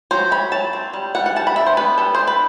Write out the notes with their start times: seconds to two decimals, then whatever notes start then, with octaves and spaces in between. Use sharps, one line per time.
0.11 F#3 C5
0.31 F#3 B5
0.52 F#3 A5
0.73 C4
0.94 G3
1.15 G3 F#5
1.26 F#5
1.36 G3 A5
1.47 B5
1.56 D4 E5
1.66 C5
1.77 B3 B4
1.98 G3 A4
2.15 D4 C5
2.27 B4